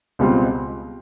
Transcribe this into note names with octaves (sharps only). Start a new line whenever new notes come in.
C#2 B2 G3 C4 F4